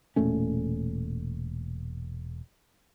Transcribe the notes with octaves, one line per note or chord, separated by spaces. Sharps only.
E1 A#2 A3 C#4